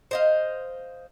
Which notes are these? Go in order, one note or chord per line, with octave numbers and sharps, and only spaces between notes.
C5 D#5 F5